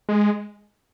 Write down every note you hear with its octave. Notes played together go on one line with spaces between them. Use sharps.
G#3